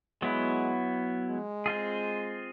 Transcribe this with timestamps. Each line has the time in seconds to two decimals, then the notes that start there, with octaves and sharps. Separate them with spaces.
0.21 F#3 G#3 B3 E4
1.30 G#3
1.66 C4 F4 G#4